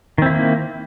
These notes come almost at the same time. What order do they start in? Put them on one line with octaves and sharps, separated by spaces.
D#3 C4 E4 A#3